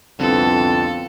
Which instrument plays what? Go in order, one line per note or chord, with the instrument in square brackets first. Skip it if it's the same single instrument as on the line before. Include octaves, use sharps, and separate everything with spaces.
[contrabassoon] C2 [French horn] F2 [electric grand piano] D3 B3 [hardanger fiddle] A4